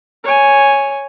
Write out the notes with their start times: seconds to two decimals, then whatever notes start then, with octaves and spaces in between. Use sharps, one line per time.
0.24 C#5 G#5